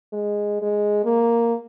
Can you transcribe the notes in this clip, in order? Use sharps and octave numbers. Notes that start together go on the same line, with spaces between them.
G#3
G#3
A#3